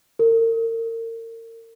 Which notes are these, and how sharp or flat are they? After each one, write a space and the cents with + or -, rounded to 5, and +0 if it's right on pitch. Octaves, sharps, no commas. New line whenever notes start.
A#4 -35